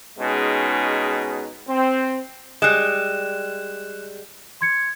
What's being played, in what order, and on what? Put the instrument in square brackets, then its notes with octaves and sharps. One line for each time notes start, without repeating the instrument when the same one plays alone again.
[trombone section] B2 G#3 C#4 D#4 G#4
C4
[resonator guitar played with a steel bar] G3 G#3 [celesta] F#6 E7
[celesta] C6 G#6 C#7